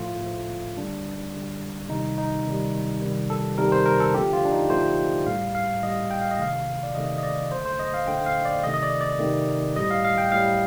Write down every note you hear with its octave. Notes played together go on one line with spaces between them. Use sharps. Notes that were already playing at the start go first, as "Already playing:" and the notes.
Already playing: A2 F3 A3 F4
A2 F3 A3
D3 G3 D4
D3 G3
C3 D#3 G3 D#4
D#4
C3 D#3 G3
C3 D#3 G3
A4
C3 D#3 G3 A#4
C5
A#4
A4
D3 F3 A3 G4
F4
D4
D#4
D3 F3 A3 C5
A2 G3 F5
F5
A2 G3 D#5
G5
F5
D#5
C3 D#3 A3 F5
D5
C3 D#3 A3 D#5
D#5
D5
D3 A3 C5
C5
D#5
F5
D3 A3 G5
F5
D5
C3 D#3 A3 D#5
D#5
D5
D5
C3 D#3 A3
A2 G3 D#5
F5
F5
G5
A2 G3 F5